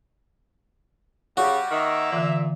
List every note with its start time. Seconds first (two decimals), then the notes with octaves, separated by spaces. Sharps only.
1.37 C#3 G3 F#4
1.71 D#3 A#3 E5
2.12 A#2 D3 E3